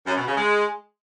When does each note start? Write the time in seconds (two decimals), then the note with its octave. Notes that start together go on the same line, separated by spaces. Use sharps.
0.07 F#2
0.17 B2
0.27 C#3
0.37 G#3